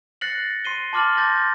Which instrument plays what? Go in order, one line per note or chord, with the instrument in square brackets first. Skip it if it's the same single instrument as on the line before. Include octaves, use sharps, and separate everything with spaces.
[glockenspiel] F#6 A6 A#6 C7 C#7 F#7
C6 C7 D#7 G7
A5 C6 D6 F6 A6 F#7
A5 C6 D6 G6 A6 A#6